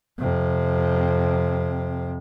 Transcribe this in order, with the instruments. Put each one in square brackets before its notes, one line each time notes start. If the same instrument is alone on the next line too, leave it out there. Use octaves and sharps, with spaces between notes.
[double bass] F2 C3